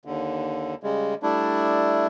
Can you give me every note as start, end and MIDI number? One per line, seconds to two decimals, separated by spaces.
0.05 0.74 39
0.05 0.74 50
0.83 1.15 49
0.83 1.15 55
0.83 1.15 56
1.23 2.07 55
1.23 2.07 57
1.23 2.07 62
1.23 2.07 64